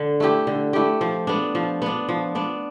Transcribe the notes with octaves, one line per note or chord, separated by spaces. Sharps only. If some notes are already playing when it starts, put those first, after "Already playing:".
Already playing: D3
A3 E4 G4
D3
A3 E4 G4
F3
B3 D4
F3
B3 D4
F3
B3 D4